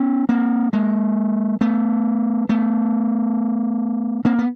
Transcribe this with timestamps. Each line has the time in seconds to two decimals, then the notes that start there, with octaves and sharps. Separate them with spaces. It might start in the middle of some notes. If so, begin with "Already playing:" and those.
Already playing: B3 C#4
0.29 A#3 C4
0.73 G#3 A#3
1.61 A3 B3
2.49 A3 B3
4.25 A#3 C4
4.39 B3